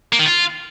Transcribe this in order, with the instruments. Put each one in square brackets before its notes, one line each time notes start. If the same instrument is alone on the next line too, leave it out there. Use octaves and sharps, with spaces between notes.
[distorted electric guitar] A#3
D#3
F4